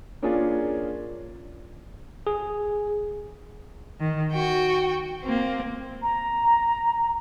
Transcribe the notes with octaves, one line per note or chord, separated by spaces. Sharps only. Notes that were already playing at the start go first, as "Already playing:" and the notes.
A#3 C#4 D4 F4 G#4
G#4
D#3
F#4 G5
A#3 C4
A#5